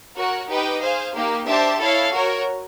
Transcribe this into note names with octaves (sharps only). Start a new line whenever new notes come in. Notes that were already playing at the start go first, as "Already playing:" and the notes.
F#4 A#4 C#5 F#5
D#4 G4 B4 D#5 G5
G#4 C5 F5
A#3 D#4 G4
D4 G4 C5 E5 A5
E4 A4 C#5 F5
F#4 A#4 C#5